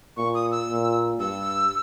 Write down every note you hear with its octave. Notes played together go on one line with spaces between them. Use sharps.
A#2 C#6
D#6
E6
A#2
G2 E6